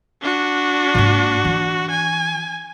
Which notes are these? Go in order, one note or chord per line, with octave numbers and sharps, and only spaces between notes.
D4 F#4
G#2 A#3
E3
G#5